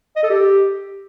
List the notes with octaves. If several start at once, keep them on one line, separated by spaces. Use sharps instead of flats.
D#5
A4
G4